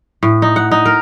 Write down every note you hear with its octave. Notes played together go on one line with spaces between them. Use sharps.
A2
D#4
F#5
D#4
A#4